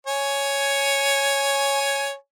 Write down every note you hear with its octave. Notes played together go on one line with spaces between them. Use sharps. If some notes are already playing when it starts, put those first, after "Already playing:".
C#5 G#5